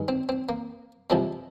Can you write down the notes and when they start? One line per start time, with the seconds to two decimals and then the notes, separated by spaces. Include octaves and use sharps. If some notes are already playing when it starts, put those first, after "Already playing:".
Already playing: G2 D#3 G#3
0.08 C4
0.29 C4
0.49 A#3
1.10 C2 C3 F3 G#3 C4